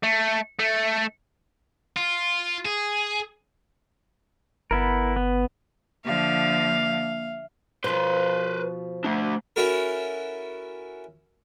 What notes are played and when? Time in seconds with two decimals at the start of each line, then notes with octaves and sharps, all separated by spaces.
0.03 A3
0.59 A3
1.97 F4
2.66 G#4
4.71 G1 B3 E4 A#4
5.16 B3
6.05 D3 F3 A#3 E5 F5
7.84 B2 F3 B4 C5
9.04 A3 D4
9.56 C#4 E4 F#4 A4 A#4